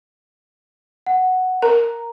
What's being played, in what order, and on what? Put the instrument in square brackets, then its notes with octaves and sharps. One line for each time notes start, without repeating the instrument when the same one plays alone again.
[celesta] F#5
[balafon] A#4 [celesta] A#5